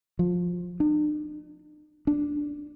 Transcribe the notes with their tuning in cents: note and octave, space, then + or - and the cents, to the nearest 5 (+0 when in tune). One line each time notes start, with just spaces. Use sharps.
F3 +20
D4 +45
D4 +0